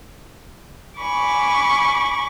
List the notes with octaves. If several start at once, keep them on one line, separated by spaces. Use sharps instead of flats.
G#5 B5 C#6 D6